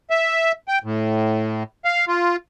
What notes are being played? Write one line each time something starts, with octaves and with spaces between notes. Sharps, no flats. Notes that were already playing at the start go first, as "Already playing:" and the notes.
E5
G5
A2
F5
F4